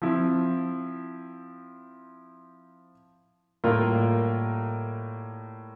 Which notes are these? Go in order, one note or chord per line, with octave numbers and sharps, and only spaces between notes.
F3 C4 E4
A2 G3 A#3 F4 A#4